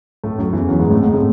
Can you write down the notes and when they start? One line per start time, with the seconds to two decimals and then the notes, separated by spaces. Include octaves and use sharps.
0.24 A2 A3
0.38 F#2 F#3
0.53 E2 E3
0.68 F#2 F#3
0.79 G#2 G#3
0.90 A2 A3
1.03 G#2 G#3
1.14 A2 A3